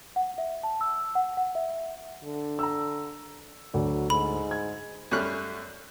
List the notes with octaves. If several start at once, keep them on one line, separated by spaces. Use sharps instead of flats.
F#5
E5
A5
E6
F#5
F#5
E5
D3
A#5 E6
D2 F#3 D5
G#2 B5
G#6
F#2 G3 A3 C#4 F6 F#6